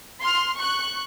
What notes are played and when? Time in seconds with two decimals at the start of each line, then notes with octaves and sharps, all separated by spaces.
0.23 C6 F6
0.57 C#6 F#6